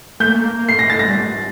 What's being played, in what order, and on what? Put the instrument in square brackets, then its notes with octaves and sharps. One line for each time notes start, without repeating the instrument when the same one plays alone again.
[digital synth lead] A3 [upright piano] G6
[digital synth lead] A#3
A3
A#3
A#3
[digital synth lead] A3 [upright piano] C7
[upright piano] A#6
[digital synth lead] A3 [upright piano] A6
[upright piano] A#6
[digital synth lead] G3
A3